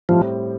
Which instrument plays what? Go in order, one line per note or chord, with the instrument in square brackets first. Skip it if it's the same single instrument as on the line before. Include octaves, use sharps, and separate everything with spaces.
[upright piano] A2 G3 C4 [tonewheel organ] F3